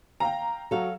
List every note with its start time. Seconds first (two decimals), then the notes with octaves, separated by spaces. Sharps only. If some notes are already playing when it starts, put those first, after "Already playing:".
0.20 F5 G5 A#5
0.71 F#3 F#4 A4 F5